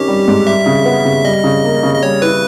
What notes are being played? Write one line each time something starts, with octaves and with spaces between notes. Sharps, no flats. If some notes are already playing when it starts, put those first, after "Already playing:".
Already playing: D#3 C#4 G4
G3
G#2
G3 E5
C#3
B3
C#3
G3 D#5
C#3
A#3
C#3
D#5
G3 C#5
E4 B4